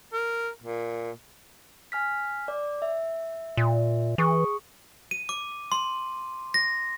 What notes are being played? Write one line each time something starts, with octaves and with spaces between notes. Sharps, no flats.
A#4
A#2
G#5 F6 B6
D5
E5
A#2
E3 G#4 C#6 D#6
D#7
D6
C6
A#6